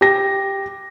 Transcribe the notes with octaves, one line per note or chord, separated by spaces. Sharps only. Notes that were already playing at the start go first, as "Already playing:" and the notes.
G4 A#6